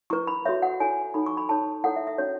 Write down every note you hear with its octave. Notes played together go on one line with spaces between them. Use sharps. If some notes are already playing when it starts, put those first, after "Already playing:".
E4 B4 C#6
B5
F#4 A4 C#5 E5
F#5
E4 A4 C#5 G#5
D#4 A4 C#5 B5
C#6
B5
D#4 A4 C#5 A5
E4 A4 C#5 F#5
E5
E5
C#4 F#4 C#5